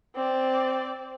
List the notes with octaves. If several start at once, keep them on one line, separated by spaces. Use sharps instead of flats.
C4 D5